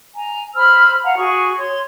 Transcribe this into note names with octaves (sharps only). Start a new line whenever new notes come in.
G#5 A#5
C5 B5 E6 F6
F5 F#5 A#5
F#4 G#4 C#6
C#5 C6